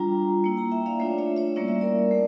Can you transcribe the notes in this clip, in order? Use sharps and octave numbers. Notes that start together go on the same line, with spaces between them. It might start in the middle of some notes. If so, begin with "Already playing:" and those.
Already playing: G3 D4 F4 G5 A#5
A#3 E4
G5 A#5
E5 G5
D5 F5
A3 D4 F4 C#5 E5
C#5 E5
C#5 E5
G3 A#3 C#4 E4 D5
E5
A#4 D5
A3